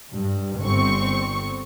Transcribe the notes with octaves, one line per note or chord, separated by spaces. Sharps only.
G2
G1 C4 C#6